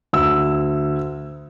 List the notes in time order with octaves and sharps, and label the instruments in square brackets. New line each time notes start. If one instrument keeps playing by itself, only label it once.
[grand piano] D2 E6